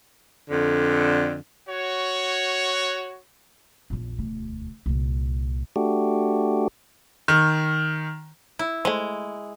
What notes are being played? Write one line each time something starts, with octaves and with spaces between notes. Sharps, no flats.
F2 D3
F#4 C#5
A#1 E2
E1 D2
C2 A#2
A3 D4 F#4 G4
D#3
E4
G#3 A3 C5